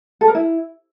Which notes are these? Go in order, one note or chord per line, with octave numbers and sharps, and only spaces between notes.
A4
A#4
E4